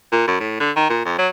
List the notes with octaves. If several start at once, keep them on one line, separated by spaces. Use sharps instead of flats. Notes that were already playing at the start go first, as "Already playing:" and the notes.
A#2
F#2
A2
D3
D#3
A#2
F2
F#3